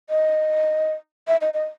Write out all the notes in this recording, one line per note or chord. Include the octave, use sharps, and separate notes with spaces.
D#5
E5
D#5
D#5